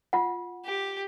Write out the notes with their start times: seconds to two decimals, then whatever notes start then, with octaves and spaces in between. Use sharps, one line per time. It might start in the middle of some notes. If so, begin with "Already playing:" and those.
0.13 F4 F#5
0.65 G4